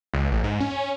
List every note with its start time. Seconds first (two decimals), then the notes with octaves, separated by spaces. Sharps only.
0.14 C#2
0.31 A1
0.44 G#2
0.60 C#4